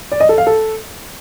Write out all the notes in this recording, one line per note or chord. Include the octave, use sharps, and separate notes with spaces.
D5
D#5
A4
F5
A4